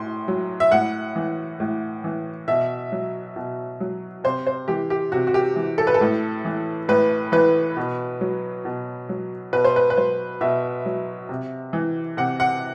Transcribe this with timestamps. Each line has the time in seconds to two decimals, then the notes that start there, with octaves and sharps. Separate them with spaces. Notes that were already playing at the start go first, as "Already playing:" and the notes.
Already playing: A2 C6
0.28 F#3
0.60 E5
0.71 A2 F#5
1.16 E3
1.60 A2
2.04 E3
2.48 B2 E5
2.92 F#3
3.36 B2
3.80 F#3
4.24 C3 C5
4.47 C5
4.68 E3 G4
4.90 G4
5.12 C3 F#4
5.27 F#4
5.34 G4
5.56 E3
5.78 A4
5.87 B4
5.94 A4
6.01 A2
6.45 E3
6.88 A2 B4
7.32 E3 B4
7.77 B2
8.21 F#3
8.65 B2
9.09 F#3
9.53 B2 B4
9.64 C5
9.76 B4
9.90 B4
9.97 F#3 C5
10.41 B2 E5
10.86 F#3
11.29 C3
11.73 E3
12.17 C3 F#5
12.40 F#5